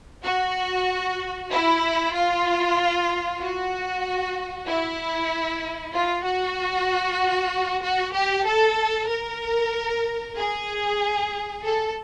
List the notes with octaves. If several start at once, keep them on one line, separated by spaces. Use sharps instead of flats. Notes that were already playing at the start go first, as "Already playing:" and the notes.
F#4
E4
F4
F#4
E4
F4
F#4
F#4
G4
A4
A#4
G#4
A4